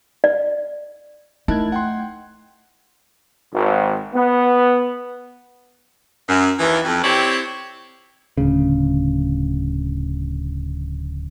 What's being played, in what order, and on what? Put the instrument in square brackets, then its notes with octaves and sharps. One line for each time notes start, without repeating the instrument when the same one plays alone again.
[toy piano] D5
[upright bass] A3 [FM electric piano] D#4 F#6 G#6 [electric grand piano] E4 A#4 A5
[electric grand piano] F#5 G5 C6
[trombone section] G#1
B3
[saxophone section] F#2
D#2 E3
F2
C4 E4 G4 C#5 D5
[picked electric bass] D1 D2 C#3